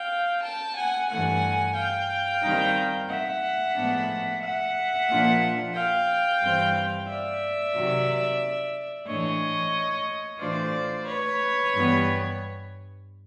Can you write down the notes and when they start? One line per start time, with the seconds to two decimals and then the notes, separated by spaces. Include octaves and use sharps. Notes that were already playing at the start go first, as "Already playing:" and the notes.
Already playing: F5 G5
0.42 G5 A5
0.75 F#5 G#5
1.09 G2 E3 A3 F#5 G#5
1.75 F5 G5
2.41 D#3 G3 C4 D#4
3.08 E5 F#5
3.75 A2 F3 G#3 B3 D4
4.41 E5 F#5
5.08 A#2 F3 A#3 D4 F4
5.73 F5 G5
6.40 G2 E3 G3 C4
7.07 D5 E5
7.73 C3 D#3 F#3
9.05 A2 E3 A3 D4 C#5 D#5
10.38 A2 E3 A3 D4 F4 C5 D5
11.05 B4 C#5
11.72 G2 E3 G3 B3